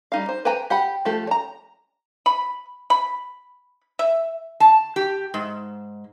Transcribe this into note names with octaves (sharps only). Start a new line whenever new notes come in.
G3 D#4 F5
C5
B4 C5 G5 G#5 A#5
G4 F#5 G5 B5
F3 A3 G4 A4
C#5 A#5
B5
B5
E5
A5
G4
G#2